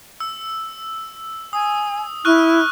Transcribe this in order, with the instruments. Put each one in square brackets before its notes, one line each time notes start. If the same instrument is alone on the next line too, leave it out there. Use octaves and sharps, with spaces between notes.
[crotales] E6
[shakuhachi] G#5 [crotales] D#6
[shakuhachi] E4 [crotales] C#6 F6 F#6